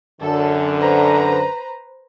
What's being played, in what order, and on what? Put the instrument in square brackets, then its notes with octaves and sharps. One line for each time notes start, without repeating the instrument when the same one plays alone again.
[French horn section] F#2 D3 [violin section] A4
[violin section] B4 C5 A#5